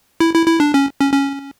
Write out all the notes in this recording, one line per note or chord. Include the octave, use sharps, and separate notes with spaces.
E4
E4
E4
D4
C#4
C#4
C#4